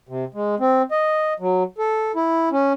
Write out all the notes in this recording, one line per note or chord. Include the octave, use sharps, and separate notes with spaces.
C3
G#3
C4
D#5
F#3
A4
E4
C#4